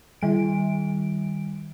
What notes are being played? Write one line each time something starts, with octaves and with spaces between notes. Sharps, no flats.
D#3 G3 D7